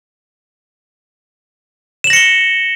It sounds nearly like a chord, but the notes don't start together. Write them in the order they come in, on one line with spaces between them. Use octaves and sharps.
E7 F#7 A#6 C#7 G7